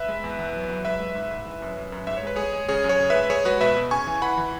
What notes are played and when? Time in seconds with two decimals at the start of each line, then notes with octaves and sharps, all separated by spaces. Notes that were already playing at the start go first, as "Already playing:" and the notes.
Already playing: B4 E5
0.08 G#3
0.24 E2
0.39 E2
0.55 F#3
0.69 F#3
0.85 G#3 B4 E5
1.00 G#3
1.15 G#2
1.31 G#2
1.46 E3
1.62 F#2
1.77 F#2
1.92 F#2
2.07 G#2 E5
2.17 C#5
2.23 G#3 B4
2.36 G#3 G#4 C#5
2.53 G#3
2.69 C#3 G#4 C#5
2.84 F#2
2.89 G#4 C#5
3.00 C#3
3.10 G#3 B4 E5
3.30 G#3 G#4 C#5
3.45 G#3 F#4 B4
3.61 B2 B4 E5
3.77 B2
3.91 C#3 G#5 C#6
4.07 E3
4.22 E3 F#5 B5
4.38 E3